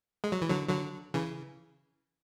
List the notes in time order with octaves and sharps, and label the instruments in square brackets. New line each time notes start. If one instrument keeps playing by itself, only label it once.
[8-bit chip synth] G#3
F#3
E3
D3 F#3
D3 F#3
C#3 E3